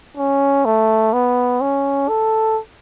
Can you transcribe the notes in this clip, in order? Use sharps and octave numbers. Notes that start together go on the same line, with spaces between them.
C#4
A3
B3
C#4
A4